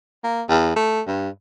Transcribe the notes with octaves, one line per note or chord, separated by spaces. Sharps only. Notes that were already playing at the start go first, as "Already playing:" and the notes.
A#3
E2
A3
G2